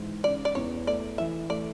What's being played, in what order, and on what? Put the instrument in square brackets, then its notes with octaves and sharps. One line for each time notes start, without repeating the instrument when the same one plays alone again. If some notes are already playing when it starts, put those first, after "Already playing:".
Already playing: [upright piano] G#2 E3
[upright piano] C#3 [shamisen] D5
[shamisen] D5
[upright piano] E2 [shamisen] C#5
[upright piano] A3 [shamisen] D5
[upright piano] E3 [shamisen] E5
[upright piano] A3 [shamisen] D5